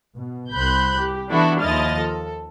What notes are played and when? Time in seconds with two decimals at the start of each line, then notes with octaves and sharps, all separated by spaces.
0.16 B2
0.53 C2 C5 B5 F#6 G6
0.98 G4
1.29 E3 B3 D4 E4 F#4 A4
1.60 D#2 F3 E4 D#5 F6 A6
1.98 A4